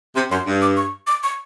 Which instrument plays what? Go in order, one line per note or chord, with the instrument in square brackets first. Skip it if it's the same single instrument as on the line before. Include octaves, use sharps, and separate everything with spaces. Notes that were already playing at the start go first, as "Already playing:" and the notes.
[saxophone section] C3 [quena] C6
[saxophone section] F#2 [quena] C6
[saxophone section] G2
[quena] D6
C#6
D6
C#6